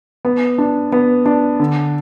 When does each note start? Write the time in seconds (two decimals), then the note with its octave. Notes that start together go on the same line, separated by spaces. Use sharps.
0.25 B3
0.58 D4
0.92 B3
1.26 D4
1.60 D3